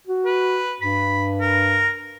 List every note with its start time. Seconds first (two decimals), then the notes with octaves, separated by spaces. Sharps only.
0.07 F#4
0.25 B4
0.81 G2 B5
1.41 A#4